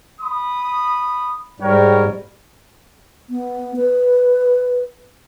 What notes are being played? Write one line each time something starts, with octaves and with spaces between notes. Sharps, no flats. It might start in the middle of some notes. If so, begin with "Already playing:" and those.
B5 D#6
G#2 G3 A#4 C#5 G5
B3
B4